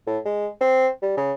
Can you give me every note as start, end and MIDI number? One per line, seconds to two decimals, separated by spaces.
0.07 0.18 45
0.25 0.48 56
0.61 0.88 60
1.02 1.13 55
1.17 1.33 49